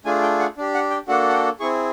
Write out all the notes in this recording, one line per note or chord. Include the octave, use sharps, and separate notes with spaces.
A3 D4 F4 G#4 G#5
G5
F#5
D4 G4
F#5
G5
A#3 D4 F#4 A4 F#5
F#5
G5
C4 E4 G#4 C#6